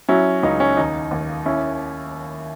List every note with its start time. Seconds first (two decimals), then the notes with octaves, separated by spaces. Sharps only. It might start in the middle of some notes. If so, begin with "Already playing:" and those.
0.09 F#3 C#4 E4
0.43 C#2 D#4
0.60 C#4
0.77 D#2 D#4
1.11 D#2
1.46 C#4 E4